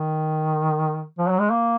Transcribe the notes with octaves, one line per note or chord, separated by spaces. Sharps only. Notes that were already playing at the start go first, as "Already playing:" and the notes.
Already playing: D#3
F3
F#3
G#3
A#3